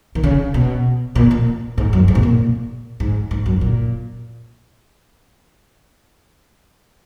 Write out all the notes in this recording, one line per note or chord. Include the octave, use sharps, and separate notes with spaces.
D#3
C#3
B2
A#2
A#2
G#2
F#2
G#2
B2
A#2
G#2
G#2
F#2
A#2